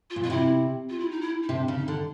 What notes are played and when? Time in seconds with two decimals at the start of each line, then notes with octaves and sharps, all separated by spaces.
0.10 F4
0.16 A#2
0.24 B2 F4
0.30 C3 E4
0.89 F4
1.00 E4
1.11 D#4
1.21 E4
1.43 D#4
1.49 C3 D4
1.68 C#3
1.78 D#4
1.88 D3